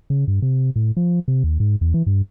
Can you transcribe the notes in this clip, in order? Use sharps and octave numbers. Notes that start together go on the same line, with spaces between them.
C#3
G2
C3
A2
F3
C3
D#2
G#2
E2
E3
G2